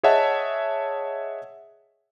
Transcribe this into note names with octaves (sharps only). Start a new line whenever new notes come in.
G#4 C#5 D#5 E5 F#5 A5